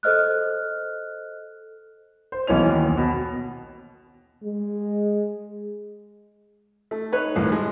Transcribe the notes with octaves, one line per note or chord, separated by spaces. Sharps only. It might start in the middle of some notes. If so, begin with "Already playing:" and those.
A4 C5 D#5 F6 F#6
C5
B1 E3 C#4 F7
D#2
B2
G#3
A3
D#4 B4 C#5
C2 A2 D#3
G#3